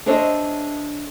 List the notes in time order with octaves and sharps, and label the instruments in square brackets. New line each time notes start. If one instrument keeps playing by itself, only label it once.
[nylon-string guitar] D4 G#4 C5 C#5 D#5 E5